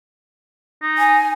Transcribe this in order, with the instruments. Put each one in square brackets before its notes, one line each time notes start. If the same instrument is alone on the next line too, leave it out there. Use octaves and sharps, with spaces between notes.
[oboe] D#4
[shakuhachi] G#5